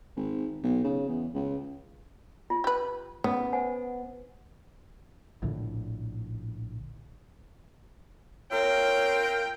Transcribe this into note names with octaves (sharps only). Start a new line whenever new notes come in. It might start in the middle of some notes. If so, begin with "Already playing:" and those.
G#1
B1
C#3
E2
C#2
F4
G4 B4
C#3 B3 D#6
C5 F#5 G#5
A#1 A2 D3
C4 F4 A#4 C#5 G5